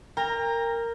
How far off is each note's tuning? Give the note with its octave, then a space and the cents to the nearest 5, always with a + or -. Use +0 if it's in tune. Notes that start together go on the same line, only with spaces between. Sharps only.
A#4 -10 G5 +35 A#5 +0